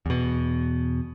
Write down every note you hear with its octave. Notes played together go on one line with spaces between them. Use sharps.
E2 B2